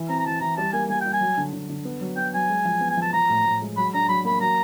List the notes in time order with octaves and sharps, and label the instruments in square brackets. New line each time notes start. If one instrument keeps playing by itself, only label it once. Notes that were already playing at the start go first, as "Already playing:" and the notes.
Already playing: [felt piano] E3
[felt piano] C4 [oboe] A#5
[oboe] A#5
[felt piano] E3 [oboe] A5
[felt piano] E3 [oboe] A#5
[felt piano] G3 [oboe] A5
[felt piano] A#3 [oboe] G#5
[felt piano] A#3 [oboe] G#5
[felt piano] G3 [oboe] G5
[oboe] G#5
[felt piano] F#3
D3
D3
D3
B3
F#3
[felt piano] B3 [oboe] G5
[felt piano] F#3 [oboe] G#5
[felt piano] G#3
F3
B3
[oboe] G#5
[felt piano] F3
[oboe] A5
[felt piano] F3 [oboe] A#5
[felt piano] A2
A2
G#3
[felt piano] F#3 [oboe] B5
[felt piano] D4 [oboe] A#5
[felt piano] F#3 [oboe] B5
[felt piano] A#3 [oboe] B5
[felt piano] F#3 [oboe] A#5